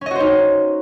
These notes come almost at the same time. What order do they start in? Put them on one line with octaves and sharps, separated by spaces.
C#4 D#5 F#4 C5 D#4